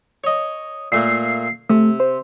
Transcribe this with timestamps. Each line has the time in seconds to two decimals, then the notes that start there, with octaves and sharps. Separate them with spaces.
0.24 C#5 D#5
0.92 A#2 A3 A#3 C7
1.70 C3 A3
2.00 C5